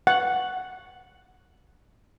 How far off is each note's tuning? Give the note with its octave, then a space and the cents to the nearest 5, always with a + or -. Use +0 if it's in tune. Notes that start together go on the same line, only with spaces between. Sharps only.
F#5 +0 C#6 +0